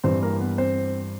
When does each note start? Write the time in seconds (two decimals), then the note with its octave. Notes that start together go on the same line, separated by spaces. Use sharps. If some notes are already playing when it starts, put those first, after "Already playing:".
0.04 G2 E3 G3 C4 C5
0.22 A#3 A#4
0.40 B3 B4
0.58 C4 C5